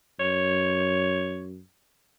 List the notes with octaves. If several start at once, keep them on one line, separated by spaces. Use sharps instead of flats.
F#2 C#5